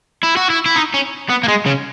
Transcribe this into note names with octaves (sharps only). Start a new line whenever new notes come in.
E4
F#4
E4
E4
D#4
C#4
B3
A#3
G#3
C#3